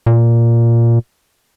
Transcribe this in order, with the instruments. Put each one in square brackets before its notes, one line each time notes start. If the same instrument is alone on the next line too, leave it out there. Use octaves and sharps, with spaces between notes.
[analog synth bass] A#2